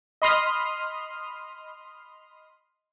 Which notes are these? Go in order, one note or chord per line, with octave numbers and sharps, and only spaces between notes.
D#5 B5 C6 D#6 F6